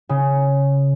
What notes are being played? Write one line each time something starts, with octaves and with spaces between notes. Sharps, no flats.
C#3